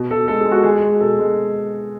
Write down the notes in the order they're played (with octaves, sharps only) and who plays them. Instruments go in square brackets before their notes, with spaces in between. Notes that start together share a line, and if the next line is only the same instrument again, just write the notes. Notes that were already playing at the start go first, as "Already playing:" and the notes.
Already playing: [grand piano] B2
B2 A4
G#3 A4
G#4
G#3
F#4
G#3 G#4
G#3
B2 A4
G#3